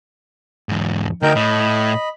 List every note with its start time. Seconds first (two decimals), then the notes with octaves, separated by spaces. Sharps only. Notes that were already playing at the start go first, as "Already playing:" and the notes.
0.69 E2 G#2
1.22 D2 D#4 A#4 G5
1.35 A2 D#5 B5